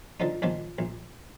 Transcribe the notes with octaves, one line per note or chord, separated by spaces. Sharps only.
D3 F3 D#4
A#1 A#2 D#3 F3
A#1